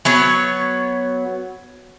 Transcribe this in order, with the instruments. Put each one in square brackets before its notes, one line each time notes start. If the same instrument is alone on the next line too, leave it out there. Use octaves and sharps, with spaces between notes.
[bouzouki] F#3 B3 C#5